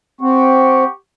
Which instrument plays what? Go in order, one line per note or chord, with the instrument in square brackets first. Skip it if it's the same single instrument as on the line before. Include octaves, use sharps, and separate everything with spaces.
[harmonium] C4 [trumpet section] G4 F#5 C#6